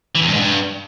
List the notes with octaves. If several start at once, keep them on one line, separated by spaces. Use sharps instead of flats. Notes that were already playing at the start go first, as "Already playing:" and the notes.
E3
E2
G2
G#2
G2